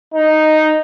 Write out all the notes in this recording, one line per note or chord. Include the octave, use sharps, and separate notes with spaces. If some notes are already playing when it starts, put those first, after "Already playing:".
D#4